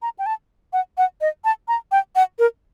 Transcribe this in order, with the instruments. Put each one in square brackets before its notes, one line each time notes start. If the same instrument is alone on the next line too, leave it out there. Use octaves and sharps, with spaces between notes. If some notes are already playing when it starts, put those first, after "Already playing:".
[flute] A#5
G5
A5
F#5
F#5
D#5
A5
A#5
G5
F#5
A#4